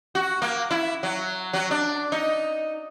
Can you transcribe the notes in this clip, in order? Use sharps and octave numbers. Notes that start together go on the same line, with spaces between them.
F#4
A#3
E4
F#3
F#3
D4
D#4